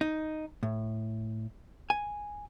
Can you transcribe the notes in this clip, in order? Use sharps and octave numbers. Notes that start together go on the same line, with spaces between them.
D#4
A2
G#5